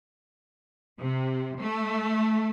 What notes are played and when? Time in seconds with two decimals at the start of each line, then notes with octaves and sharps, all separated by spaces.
0.99 C3
1.59 A3